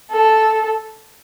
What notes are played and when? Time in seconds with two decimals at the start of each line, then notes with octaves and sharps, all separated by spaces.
0.11 A4